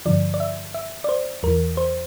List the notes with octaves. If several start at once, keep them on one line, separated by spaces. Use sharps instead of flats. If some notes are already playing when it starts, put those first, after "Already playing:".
G2 D3 F3 D5
D5
E5
E5
D5
C5
E2 E3 A#4
C5